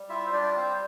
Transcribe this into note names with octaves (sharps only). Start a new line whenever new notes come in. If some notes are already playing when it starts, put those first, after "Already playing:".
Already playing: G3
E4 F4 E5
C5
G3 D4 D5
C4 C5